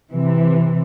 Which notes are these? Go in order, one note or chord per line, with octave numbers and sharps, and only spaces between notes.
C3 E3